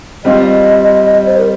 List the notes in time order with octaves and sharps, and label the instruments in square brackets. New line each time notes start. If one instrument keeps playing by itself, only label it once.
[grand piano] G3 C4 F4 [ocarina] D#5
[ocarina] D#5
C5
A#4